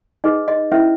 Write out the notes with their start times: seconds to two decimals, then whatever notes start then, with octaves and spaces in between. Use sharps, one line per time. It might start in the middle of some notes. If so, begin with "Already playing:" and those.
0.24 D#4 G#4 B4 D#5
0.48 D#5
0.72 C#4 E4 B4 E5